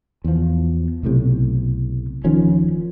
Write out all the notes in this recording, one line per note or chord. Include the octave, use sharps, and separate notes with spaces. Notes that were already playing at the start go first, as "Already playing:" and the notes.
E2 F3
B1 A2 C3
D1 D#3 F3 C#4